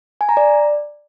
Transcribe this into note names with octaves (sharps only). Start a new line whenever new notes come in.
G#5
A#5
D5